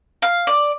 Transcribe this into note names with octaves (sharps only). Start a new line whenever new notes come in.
F5
D5